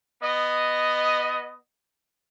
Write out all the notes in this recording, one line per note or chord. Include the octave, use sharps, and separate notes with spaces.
B3 D#5